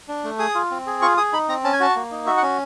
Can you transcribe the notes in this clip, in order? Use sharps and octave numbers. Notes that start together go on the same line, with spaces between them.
D4
A3
G#4 D#6
F4
C4
G#4
F4 C#6
G#4 D#6
D#4 B5
C4 A#5
C#4 A5
G#5
F#4 A5
A#3
D#4
F#4 E5
F#5
C#4